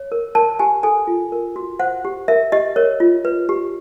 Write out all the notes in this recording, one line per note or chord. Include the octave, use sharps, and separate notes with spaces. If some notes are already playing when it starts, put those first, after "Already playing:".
Already playing: C#5
A#4
A#4 A5
G4 G#5
A4 G#5
F4
A#4
F#4
C5 F#5
G4
A#4 E5
G4 D#5
A#4 C#5
F4
B4
G4